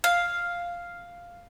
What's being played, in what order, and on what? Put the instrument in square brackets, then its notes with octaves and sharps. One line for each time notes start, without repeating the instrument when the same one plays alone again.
[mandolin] F5